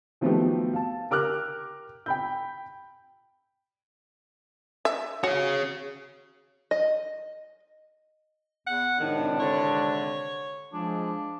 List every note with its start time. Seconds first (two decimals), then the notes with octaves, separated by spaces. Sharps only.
0.21 D#3 F3 F#3 A3 B3 G4
0.74 F5 A5
1.10 G4 A#4 D6 F6 F#6
2.06 G5 B5 G6
4.85 E5
5.24 F#4 G#4 C#5
6.71 D#5
8.67 E2 F#5
9.00 G#1 A2 C3 D#3 D4
9.40 D3 C#5
10.73 F3 G#3 D4